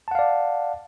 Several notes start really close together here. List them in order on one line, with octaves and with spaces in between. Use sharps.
A5 F#5 F5 D5